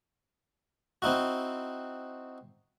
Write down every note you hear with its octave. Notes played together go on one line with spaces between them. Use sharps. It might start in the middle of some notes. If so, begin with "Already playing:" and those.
C4 D#4 E4 F#4